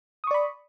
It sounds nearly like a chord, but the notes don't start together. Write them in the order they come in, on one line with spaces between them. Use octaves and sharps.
D#6 C#6 D5 B5